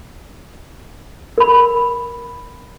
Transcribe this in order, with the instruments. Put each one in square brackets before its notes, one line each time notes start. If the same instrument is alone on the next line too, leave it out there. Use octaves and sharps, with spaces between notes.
[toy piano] A#4 B5